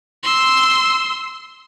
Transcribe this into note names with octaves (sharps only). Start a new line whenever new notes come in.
C6 E6